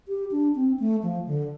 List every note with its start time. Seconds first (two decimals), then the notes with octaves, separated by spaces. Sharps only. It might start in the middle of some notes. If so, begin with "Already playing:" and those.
0.08 G4
0.31 D4
0.55 C4
0.80 A3
1.03 F3
1.27 D3